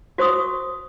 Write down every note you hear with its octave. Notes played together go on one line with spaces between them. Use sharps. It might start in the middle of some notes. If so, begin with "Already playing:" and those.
F#4 C5 C#6 D#6